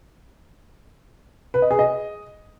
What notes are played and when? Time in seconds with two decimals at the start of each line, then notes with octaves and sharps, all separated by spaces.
1.54 B4
1.62 D#5
1.71 G#4
1.79 D#5